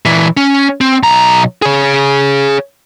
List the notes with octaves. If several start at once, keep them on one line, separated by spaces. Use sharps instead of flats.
A#2 E3
C#4
C4
B1 A#5
G#4 C#5